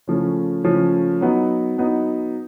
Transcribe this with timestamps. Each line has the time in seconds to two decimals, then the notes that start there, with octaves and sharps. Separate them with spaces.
0.07 C#3 F3 A3 C#4
0.64 C#3 F3 A3 C#4
1.21 F#3 B3 D#4
1.78 F#3 B3 D#4